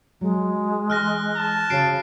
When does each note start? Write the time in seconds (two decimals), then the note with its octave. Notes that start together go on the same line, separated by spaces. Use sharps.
0.21 F#3 G#3
0.90 E3 F6 F#6 A#6
1.36 A5
1.70 C#3 F#4 C5 C#5 C7 D7